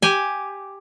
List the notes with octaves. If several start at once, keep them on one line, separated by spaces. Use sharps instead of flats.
G4 G#5